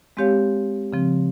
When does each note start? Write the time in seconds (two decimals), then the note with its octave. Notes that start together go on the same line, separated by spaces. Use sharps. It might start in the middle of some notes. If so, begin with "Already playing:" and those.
0.17 G#3 C4 G4 C#5 F5
0.93 C#3 F3 C4